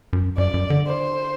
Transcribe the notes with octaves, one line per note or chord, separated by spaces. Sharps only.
F#2
F#2 D5
F#2
D3
C5